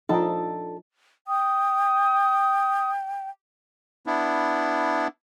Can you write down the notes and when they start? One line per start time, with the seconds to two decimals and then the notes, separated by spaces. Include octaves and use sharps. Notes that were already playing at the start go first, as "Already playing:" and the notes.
0.09 F3 D4 D#4 A4
1.28 G5 D#6
4.06 B3 D4 E4